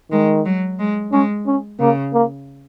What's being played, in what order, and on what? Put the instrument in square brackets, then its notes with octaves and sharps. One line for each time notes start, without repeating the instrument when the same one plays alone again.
[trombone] D#3 [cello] G#3
[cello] F#3
G#3
[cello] G#3 [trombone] C#4
[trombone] C#4
[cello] C#3 [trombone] A#3
[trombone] A#3